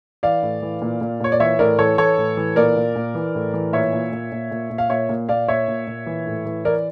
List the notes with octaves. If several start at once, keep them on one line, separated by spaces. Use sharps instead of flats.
E3 D5 F5
A2
E3
A#2
A#2
A#2 C#5
D5
E3 C#5 E5
A2 A#4 D5
E3 A4 C#5
E3 A4 C#5
A2
E3
A#2 A#4 D5
A#2
A#2
E3
A2
E3
A#2 C#5 E5
A#2
A#2
A#2
A#2
A#2
F5
A#2 C#5 E5
A#2
A#2 D5 F5
A#2 C#5 E5
A#2
A#2
E3
A2
E3
E3 A#4 D5